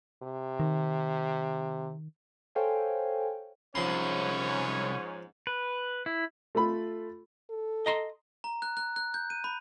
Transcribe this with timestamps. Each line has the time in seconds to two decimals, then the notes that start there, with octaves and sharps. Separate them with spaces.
0.23 C3
0.60 D#3
2.55 A4 C5 C#5 F5 G5 G#5
3.75 C2 G#2 F3 C#4 C#5 C6
5.47 B4
6.06 E4
6.55 A3 F4 A4 B5
7.50 A4
7.86 D#5 A#5 C6
8.44 A#5
8.62 F#6
8.77 F#6
8.96 F#6
9.14 G6
9.30 D#7
9.44 B5